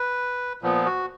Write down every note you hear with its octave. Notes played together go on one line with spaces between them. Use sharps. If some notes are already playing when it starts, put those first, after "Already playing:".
Already playing: B4
A#2 F3 B3
F#4